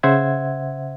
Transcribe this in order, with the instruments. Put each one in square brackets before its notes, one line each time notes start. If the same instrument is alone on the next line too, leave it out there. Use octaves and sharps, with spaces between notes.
[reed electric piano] C#3 C5 E5 F#5 G#6